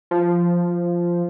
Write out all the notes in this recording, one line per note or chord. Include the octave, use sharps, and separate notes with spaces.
F3